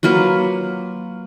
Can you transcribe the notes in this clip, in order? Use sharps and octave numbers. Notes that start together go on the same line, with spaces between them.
F#3 A#3 F4 B4